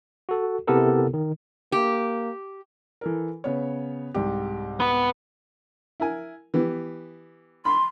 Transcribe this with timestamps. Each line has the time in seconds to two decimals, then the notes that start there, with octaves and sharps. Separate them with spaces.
0.29 F#4 A4
0.67 C3 B3 E4 G4 A4 A#4
1.14 D#3
1.72 A#3 G4
3.01 E3 A4 A#4
3.44 C#3 B3 C#5
4.14 C2 G#2 G4
4.80 B3 B4
6.00 E4 A#4 G#5
6.54 E3 B3 G4
7.65 B5 C6